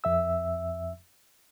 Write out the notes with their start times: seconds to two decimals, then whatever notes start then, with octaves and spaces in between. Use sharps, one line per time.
0.04 F2 E5 E6